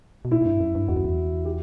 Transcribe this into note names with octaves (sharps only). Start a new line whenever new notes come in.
B2
A#2 E4
A#2
G2
F#2
G2
E2 F#4
F#2
E2
G4